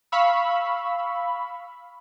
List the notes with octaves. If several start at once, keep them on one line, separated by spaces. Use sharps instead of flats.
F5 B5 C#6 E6